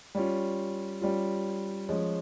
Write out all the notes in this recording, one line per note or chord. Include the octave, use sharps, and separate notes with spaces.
G3 C#4 F4
G3 C#4 F4
F3 G#3 C#4